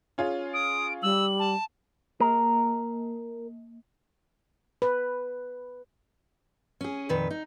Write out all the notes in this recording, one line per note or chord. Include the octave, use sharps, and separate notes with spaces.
C#4 F4 G#4
D#6 D7
G3 E6 F#7
A5
A#3 A#4
B4
C#4 G#4
F2 A#2 D#3 B4
D#4